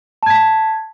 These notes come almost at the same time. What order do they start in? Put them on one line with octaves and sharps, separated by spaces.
A5 G#6 B6